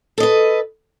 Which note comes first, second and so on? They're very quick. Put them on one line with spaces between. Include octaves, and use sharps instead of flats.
A4 D#5 B4